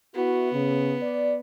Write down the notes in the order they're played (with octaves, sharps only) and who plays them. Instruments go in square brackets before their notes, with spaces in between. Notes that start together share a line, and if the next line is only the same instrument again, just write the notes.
[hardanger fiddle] B3 [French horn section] E4 F#4
[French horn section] C#3
D5